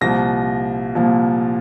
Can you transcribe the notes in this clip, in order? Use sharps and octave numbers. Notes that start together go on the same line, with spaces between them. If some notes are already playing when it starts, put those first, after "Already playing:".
C2 A#2 F3 A#3 A#6
C2 A#2 F3 A#3